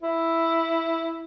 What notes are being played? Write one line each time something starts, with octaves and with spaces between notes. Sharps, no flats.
E4